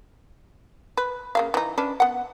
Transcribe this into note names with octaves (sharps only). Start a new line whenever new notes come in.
B4
C#3 A#3 F5
E3 D#4
C#4 D4 B4
B3 F#5